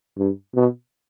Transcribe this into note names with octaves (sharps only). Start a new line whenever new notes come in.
G2
B2